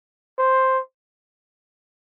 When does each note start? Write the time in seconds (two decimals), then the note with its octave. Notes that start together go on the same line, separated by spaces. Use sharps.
0.38 C5